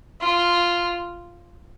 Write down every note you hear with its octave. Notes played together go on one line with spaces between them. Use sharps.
F4